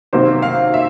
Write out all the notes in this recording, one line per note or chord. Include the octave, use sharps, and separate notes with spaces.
C3 D#3 F#3 A#3 C5
F5
E5